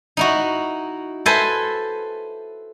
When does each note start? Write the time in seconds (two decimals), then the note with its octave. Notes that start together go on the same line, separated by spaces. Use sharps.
0.17 D#4 E4 F#4
1.26 A4 B4 C5 E5 G#5